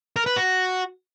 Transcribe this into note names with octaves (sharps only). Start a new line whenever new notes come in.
A#4
B4
F#4